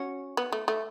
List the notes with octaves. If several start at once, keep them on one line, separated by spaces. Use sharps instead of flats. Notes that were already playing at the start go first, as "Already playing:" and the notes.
Already playing: C#4 F#4
B3
A3
A3